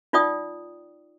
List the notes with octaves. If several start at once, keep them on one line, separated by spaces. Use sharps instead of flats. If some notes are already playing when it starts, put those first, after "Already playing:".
D#4 F4 D5 G5 D#6